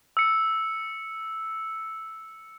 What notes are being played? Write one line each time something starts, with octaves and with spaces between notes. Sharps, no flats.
E6 C#7